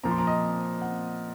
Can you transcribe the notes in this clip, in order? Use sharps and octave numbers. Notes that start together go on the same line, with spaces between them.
A#2 F3 A#5
C6
A#5
D#5
F#5